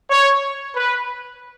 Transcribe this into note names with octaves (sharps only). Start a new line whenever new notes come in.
C#5
B4